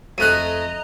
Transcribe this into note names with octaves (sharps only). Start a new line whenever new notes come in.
F2 A3 D#5 G#5 A#5 F#6 D#7